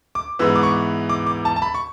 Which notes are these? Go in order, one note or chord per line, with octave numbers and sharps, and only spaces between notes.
D6
G#2 E3 B3 E6
D6
C#6
D6
D6
A5
A5
B5
C#6